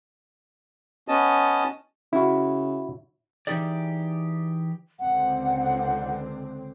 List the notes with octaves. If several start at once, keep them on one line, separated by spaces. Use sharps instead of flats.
B3 C#4 D#5 A5
C#3 E4 F#4
E3 G3 D#4 G4 G#4 D5
C#2 D3 C4 F#5